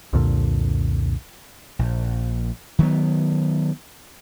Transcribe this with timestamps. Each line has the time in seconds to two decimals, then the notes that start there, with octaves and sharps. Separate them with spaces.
0.13 C2 F2 A#2 D3
1.79 A#1
2.79 D#3 F#3 G#3 B3